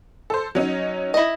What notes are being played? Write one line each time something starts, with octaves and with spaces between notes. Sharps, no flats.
A4 C5
F#3 C#4 D#4
E4 D#5